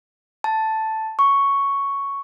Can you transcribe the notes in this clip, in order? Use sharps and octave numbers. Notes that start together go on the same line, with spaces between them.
A5
C#6